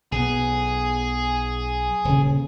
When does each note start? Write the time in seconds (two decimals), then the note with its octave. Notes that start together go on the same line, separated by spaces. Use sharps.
0.12 B1 B3 G#4
2.05 D#1 C#3